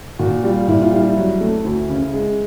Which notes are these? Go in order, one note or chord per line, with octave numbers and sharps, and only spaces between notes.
A#2 F#4
G3 F4
A#2 E4
F4
G3 E4
F#3
A3
D2
C#3
G#3